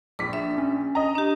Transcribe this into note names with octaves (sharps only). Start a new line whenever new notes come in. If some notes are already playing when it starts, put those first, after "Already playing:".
A#1 D6 B6
D4 E5
C#4
D#5 A#5
D4 G4